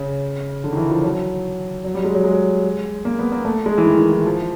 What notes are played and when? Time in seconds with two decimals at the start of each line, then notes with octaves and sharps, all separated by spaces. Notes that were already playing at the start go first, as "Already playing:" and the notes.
Already playing: C#3
0.64 D3
0.73 D#3
0.77 E3
0.91 F3
1.03 F#3
1.84 F#3
1.95 G3
2.04 G#3
2.15 F#3
2.24 G#3
3.05 A#3
3.19 B3
3.32 A#3
3.45 A3
3.66 G#3
3.78 E3
3.85 D#3
4.00 D#3
4.12 E3
4.26 F3